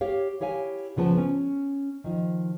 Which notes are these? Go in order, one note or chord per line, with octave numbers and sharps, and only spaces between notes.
G4 C#5 F5
E4 G4 C#5 F5 G#5
D2 C#3 F3 B3 A5
C#4
D#3 F3